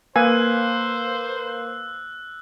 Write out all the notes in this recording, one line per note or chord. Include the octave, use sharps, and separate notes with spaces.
A#3 B4 C5 F5 G#5 E6 F#6